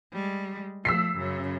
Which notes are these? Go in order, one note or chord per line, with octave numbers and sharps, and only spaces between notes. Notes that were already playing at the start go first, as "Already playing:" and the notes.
G3 G#3
F3 A3 E6 B6 C7
F#2 C#3